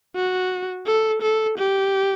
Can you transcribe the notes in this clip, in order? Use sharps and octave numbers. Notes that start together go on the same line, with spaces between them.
F#4
A4
A4
G4